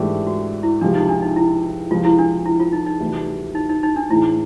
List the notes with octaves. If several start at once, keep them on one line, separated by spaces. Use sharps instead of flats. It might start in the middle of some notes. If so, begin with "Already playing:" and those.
Already playing: G#2 E3 A3 D4 G4
F#4
E4
C#2 C3 F3 D4
D#4
D4
D#4
E4
C#2 C3 F3 F4
E4
D4
E4
F4
D#4
D#4
D2 C3 E3 G3
D#4
D#4
D#4
D4
A2 E3 G#3 E4